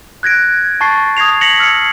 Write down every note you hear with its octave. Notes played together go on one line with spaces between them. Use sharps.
F#6 G#6 A#6 D7
A5 C#6 A6 C7
D#6 G#6 A#6 C7 F7
A#6 B6 C#7 F7 F#7
E6 F6 G#6 C7 C#7